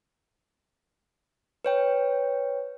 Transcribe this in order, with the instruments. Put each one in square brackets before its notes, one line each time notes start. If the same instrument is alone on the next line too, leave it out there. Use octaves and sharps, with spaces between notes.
[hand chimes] B4 C#5 G5